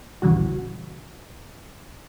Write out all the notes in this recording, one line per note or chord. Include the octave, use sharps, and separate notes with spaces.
A#1 D#2 C#3 E3 G3 F#4